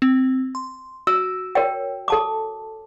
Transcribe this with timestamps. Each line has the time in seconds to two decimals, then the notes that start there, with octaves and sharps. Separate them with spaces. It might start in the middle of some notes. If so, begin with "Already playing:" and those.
0.02 C4
0.55 C6
1.07 F#4 E6
1.55 A#4 C#5 G5
2.08 A4 A5 D6